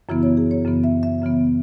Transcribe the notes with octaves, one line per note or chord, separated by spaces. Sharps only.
F#2 C#3 E3 B3 E4
C#5
G#4
C#5
F#2 C#3 E3 B3
E5
E5
F#2 C#3 E3 B3